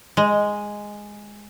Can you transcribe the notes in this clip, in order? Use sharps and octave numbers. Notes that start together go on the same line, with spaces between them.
G#3